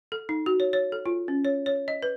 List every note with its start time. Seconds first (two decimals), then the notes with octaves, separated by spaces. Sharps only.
0.12 A4
0.29 D#4
0.46 F#4
0.60 C#5
0.73 C#5
0.92 A4
1.06 F4
1.28 C#4
1.45 C#5
1.66 C#5
1.88 D#5
2.03 B4